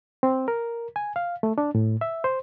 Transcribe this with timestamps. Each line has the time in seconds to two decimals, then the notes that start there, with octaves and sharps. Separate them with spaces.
0.23 C4
0.48 A#4
0.96 G#5
1.16 F5
1.43 A3
1.58 D4
1.75 A2
2.01 E5
2.24 C5